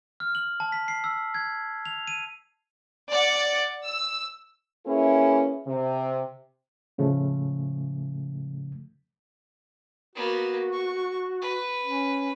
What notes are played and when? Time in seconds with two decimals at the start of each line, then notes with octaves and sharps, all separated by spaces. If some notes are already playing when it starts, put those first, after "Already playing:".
0.20 F6
0.35 F#7
0.60 A5
0.72 B6
0.88 C7
1.04 E6
1.34 G#6
1.85 F7
2.07 D#7
3.10 D5 F#5
3.84 E6
4.86 A#3 C#4 E4 G#4 B4
5.67 C3
6.98 A2 C#3 F3 A3
10.15 A#3 B3 F#4
10.73 C#6
11.42 B4
11.83 C#4